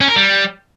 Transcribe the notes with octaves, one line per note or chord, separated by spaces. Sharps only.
C#4
A#4
G3